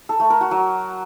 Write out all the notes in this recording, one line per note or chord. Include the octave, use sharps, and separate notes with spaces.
A4
A3
A#4
F#4
F#3